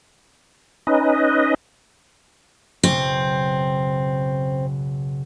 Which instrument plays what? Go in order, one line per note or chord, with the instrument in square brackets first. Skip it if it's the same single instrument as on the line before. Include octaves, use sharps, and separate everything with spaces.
[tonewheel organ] C#4 D#4 B4 D#5
[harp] F#1 B1 C#3 [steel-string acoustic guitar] C4